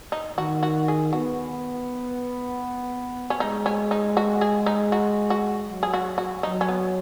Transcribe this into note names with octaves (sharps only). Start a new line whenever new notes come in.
D#4
D#3 F#4
F#4
G#4
B3 F#4
C#4
G#3 D#4
C#4
D#4
F#4
G#4
D#4
F#4
F#4
F#3
G#4
F#4
F#4
F#3 D#4
C#4
B3